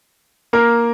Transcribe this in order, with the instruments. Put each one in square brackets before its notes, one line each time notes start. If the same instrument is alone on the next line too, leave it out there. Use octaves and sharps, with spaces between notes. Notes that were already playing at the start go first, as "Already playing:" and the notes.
[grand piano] A#3 A#4